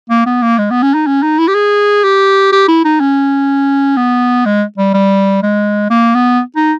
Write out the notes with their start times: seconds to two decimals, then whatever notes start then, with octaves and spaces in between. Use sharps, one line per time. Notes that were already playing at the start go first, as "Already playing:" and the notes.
0.10 A#3
0.26 B3
0.42 A#3
0.58 G#3
0.70 B3
0.82 C#4
0.94 D#4
1.07 C#4
1.23 D#4
1.39 E4
1.48 G4
1.55 G#4
2.04 G4
2.52 G4
2.68 E4
2.85 D#4
3.00 C#4
3.97 B3
4.46 G#3
4.78 G3
4.94 G3
5.43 G#3
5.90 A#3
6.15 B3
6.56 D#4